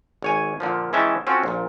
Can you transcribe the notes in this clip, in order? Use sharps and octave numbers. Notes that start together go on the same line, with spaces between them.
G#1 C#5 G#5
A#2 D3 F3
E3 G#3 C#4 E5 G5 A5
C4 C#4 F4 F#4 A4
A#1 A#2